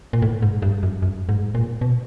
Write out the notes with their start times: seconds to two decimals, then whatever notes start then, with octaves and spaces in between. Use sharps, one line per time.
0.13 A#2
0.22 A2
0.42 G#2
0.62 G2
0.83 F#2
1.02 F#2
1.29 G#2
1.55 A#2
1.81 B2